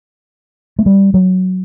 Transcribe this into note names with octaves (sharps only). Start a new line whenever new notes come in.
A3
G3
F#3